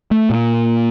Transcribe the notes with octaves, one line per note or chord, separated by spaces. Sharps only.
A3
A#2